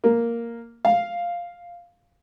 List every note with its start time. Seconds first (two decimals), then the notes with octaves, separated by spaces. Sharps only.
0.04 A#3
0.85 F5